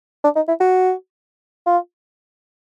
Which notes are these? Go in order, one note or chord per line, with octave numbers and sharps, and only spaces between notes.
D4
D#4
E4
F#4
F4